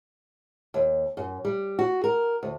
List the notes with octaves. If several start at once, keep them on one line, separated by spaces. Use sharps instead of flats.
D#2
F#2
G3
F#4
A#4
D2